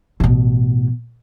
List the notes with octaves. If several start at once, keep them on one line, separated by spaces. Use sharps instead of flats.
A1 B2